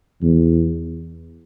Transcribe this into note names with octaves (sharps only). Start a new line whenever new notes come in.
E2